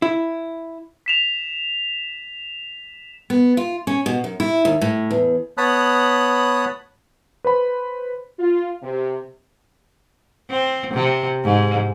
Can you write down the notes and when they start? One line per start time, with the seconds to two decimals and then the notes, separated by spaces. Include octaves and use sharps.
0.02 E4
1.06 B6 E7 F7
3.30 B3
3.57 F4
3.87 C#4
4.06 B2
4.24 F#2
4.40 E4
4.65 D#2
4.81 A2
5.11 E2
5.58 B3 C#5 A5 B5 D#6 F#6
7.45 B4 C5 B5
8.39 F4
8.83 C3
10.50 C4
10.94 C3
11.44 G#2